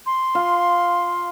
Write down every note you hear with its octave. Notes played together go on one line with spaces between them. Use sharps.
C6
F4